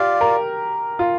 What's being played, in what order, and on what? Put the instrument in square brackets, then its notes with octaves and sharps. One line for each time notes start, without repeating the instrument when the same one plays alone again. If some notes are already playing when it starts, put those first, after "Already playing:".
Already playing: [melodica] F4 D5 F5 [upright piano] G4
[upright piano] A#4
F4